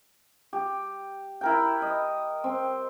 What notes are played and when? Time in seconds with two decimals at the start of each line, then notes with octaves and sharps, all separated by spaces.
0.53 G4
1.41 E4 A#4 G5
1.82 D#5
2.44 C4